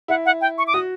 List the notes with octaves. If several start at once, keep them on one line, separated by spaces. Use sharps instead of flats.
E4 F#5
F#5
G5
C#6
D6
F#4 D#6